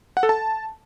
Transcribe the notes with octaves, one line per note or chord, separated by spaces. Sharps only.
F#5
A4
A5